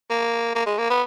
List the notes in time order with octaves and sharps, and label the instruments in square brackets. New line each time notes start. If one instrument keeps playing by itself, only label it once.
[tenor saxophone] A#3
A#3
G#3
A#3
B3